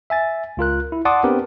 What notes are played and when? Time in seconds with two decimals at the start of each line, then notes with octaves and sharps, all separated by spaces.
0.10 E5 G#5 A6
0.57 C#2 F4 A#4 F#6
0.92 E4
1.05 D5 F#5 A5 C6 D6 D#6
1.23 B3 C4 D4 G4 A#4 B4